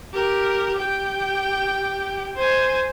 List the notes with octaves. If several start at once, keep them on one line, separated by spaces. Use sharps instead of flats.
G4 A#4
G4 G5
C5 G#5